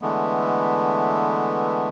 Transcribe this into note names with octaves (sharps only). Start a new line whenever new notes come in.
D3 E3 G#3 A3 B3